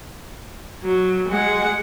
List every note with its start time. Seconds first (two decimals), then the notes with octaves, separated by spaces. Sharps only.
0.83 F#3
1.28 G#3 F#5